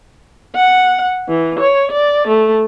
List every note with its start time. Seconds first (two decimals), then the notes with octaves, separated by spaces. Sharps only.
0.56 F#5
1.29 E3
1.59 C#5
1.91 D5
2.28 A3